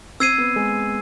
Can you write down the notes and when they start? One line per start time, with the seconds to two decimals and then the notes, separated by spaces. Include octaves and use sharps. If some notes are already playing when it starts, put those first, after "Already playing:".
0.20 C4 E6 G#6 C7 D#7
0.38 B3
0.56 G#3